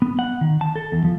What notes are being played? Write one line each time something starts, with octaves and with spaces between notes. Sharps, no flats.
B3
F#5
D#3
A5
A4
E2
F3